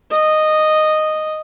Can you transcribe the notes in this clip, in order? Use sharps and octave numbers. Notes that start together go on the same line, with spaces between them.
D#5